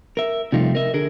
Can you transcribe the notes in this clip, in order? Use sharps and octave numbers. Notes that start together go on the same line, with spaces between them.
A#4 E5
C3 F3 G3 A3 D#4 F4
A#4 D#5 E5
D3 G#4 A#4